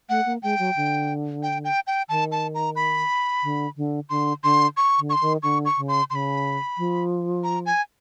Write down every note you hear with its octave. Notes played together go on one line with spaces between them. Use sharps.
A3 F#5
A#3
G#3 G5
F#3
D3
G5
G5
G5
D#3 A5
A5
A#5
B5
D3
D3
D3 C6
D3 C6
C#6
D3
C#6
C6
D#3
D3 C#6
C#6
C#3
C6
C#3 B5 C6
F3
A#5
G#5